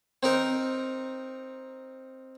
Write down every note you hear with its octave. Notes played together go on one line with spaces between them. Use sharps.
C4 D#4 A#4